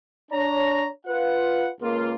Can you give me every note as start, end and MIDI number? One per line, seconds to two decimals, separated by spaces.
0.32 0.88 62
0.32 0.88 73
0.32 0.88 82
1.06 1.69 65
1.06 1.69 71
1.06 1.69 78
1.81 2.15 37
1.81 2.15 58
1.81 2.15 65